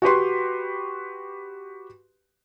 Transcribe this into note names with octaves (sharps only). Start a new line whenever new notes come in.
F#4 G4 B4 C6